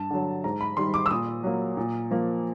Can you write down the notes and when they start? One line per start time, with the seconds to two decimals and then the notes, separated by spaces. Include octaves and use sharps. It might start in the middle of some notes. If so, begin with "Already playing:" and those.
Already playing: G2 A5
0.10 D3 F#3
0.44 G#2 A#5
0.61 B5
0.77 D#3 G3 C6
0.94 D6
1.06 E6
1.11 A#2 D#6
1.43 F#3 A#3
1.77 A#2
2.11 F3 A#3